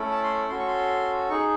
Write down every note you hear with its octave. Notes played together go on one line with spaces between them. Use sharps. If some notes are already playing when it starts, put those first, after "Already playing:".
Already playing: A3 C#4 E4 A4
A5
C6
C#4 F#4 A4 C6
C#6
C6
D#4 G#4 C#6